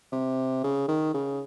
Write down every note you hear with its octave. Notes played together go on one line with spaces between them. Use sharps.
C3
C#3
D#3
C#3